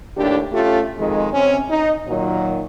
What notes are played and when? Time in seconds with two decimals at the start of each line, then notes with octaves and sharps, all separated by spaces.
0.17 D#2 A2 D4 G4
0.53 A3 C#4 F4 G4
0.97 F2 D#3 G#3
1.33 C3 C#4
1.70 D#4
2.08 A#2 D#3 F#3